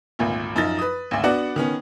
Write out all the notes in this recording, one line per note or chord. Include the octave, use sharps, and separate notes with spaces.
G#1 D2 A#2
F#2 F3 D#4 F4 A6
B4 D#6
G#1 D2
B3 D4 F#4 D5 F#5
D#3 B3 C#4